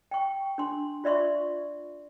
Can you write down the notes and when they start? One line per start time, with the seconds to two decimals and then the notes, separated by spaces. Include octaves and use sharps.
0.11 G5 C#6
0.58 D4 C6
1.04 F4 D5 E5 C6 C#6